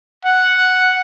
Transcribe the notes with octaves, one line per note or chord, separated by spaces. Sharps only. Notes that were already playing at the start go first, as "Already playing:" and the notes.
F#5